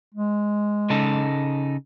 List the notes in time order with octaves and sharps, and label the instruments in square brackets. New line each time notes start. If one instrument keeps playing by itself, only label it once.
[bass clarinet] G#3
[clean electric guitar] C#3 D#4 A4